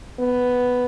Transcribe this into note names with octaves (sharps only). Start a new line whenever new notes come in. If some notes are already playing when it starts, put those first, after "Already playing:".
B3